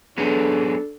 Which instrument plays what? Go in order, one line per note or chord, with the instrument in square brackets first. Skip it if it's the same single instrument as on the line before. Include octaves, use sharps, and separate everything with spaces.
[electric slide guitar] F#3 B3 G#4 [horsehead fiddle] D4 A4